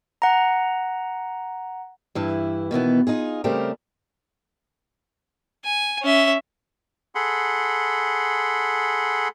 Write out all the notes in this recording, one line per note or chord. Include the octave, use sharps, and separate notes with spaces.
F#5 A#5
G2 E3 E4
B2 D#3 E3 B3
D#4 F4 G#4
C#3 G3 A3 C4 G4 A#4
G#5
C#4 E5
G#4 A4 F#5 B5 C6